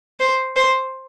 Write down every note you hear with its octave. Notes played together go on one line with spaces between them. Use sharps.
C5
C5